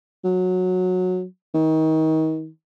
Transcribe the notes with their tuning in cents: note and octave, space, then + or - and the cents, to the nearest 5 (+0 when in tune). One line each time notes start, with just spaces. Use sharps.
F#3 -15
D#3 +30